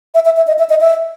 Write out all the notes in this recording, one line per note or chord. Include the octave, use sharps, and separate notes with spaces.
E5
E5
E5
D#5
E5
D#5
E5